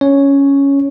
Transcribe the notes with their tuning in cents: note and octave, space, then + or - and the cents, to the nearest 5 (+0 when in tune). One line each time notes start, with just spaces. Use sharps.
C#4 +5 C#5 +0